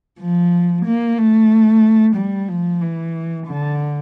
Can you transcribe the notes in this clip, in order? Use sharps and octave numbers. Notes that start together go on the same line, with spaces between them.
F3
A#3
A3
G3
F3
E3
D3